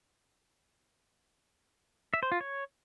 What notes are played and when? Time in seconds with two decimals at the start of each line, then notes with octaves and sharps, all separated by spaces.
2.14 E5
2.23 C5
2.32 F4
2.41 C#5